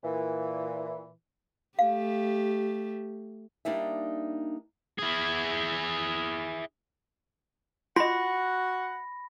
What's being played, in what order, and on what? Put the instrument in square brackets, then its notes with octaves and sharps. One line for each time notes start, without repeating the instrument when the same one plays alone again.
[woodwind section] A#2 E3
[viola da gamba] A3 G4 [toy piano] F5
[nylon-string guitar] G3 A#3 D4 D#4 E5
[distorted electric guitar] E4 G#4
[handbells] F4 D#5 [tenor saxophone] F#4 [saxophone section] F#5 [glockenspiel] B5 A#6